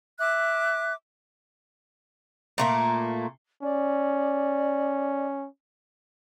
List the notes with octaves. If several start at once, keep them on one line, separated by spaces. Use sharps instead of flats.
E5 D6 F#6
A#2 A3 A#3
C#4 D5